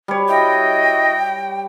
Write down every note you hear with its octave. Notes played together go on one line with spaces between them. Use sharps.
G3 C#5
E4 F#4 D#5 G5